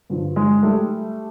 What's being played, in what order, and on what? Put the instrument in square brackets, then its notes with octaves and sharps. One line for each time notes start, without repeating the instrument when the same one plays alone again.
[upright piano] G2 D3 F3
G#3
G3 A3